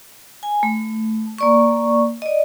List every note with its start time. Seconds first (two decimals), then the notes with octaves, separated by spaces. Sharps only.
0.43 G#5
0.63 A3
1.38 A#3 D5 C#6
2.22 D5 D#5